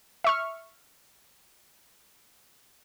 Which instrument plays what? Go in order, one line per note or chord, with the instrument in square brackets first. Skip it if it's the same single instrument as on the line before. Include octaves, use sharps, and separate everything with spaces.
[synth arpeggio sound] E5 C#6 F6